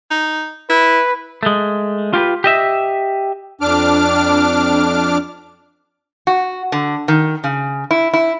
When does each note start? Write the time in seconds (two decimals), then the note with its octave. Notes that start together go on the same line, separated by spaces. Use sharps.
0.11 D#4
0.70 E4 B4
1.43 G#3 A3
2.14 F4 G4 A#4 B4
2.44 G4 D#5 E5
3.61 F2 D4 D6 F6
6.27 F#4
6.72 D3
7.08 D#3
7.44 C#3
7.91 E4
8.14 E4